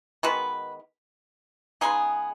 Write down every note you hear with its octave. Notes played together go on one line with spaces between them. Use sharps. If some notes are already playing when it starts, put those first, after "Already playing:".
D#3 G#3 B3 F#4 B4
C#3 G#3 B3 D#4 G#4